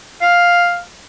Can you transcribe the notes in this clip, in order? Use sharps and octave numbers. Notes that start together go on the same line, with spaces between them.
F5